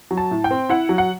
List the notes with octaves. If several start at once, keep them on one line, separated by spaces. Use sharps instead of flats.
F#3
A5
A2
G5
C4
E4 F#5
F#3
F#5